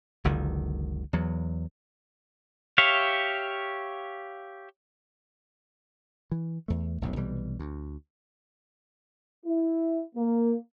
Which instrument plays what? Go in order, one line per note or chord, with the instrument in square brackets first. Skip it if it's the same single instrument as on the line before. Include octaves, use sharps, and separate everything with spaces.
[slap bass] F#1 C#2 D3 D#3
E2 F#3
[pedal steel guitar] G4 C#5 E5 F5
[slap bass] E3
E2 A3
F1 B1 A2
B1 C3 E3 G3
D2
[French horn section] E4
A#3